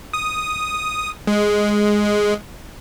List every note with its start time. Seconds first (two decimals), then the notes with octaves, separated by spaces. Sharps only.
0.13 D#6
1.27 G#3